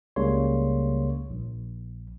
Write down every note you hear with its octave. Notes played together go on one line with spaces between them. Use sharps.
C#2 C#3 G3 A#3 C#5 C6
A#1